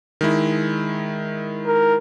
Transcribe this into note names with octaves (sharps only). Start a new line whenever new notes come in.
D#3 G#3 E4
A#4